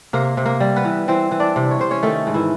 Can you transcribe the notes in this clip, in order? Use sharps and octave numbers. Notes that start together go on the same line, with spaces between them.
C3 A#3 A#4
C3
A#3 A#4
G3
B3 B4
E3
E3 C4 C5
E3
D4 D5
C3
C#5
C3 C5
C#4 C#5
D#3 A3 A4
G#2
E3 E4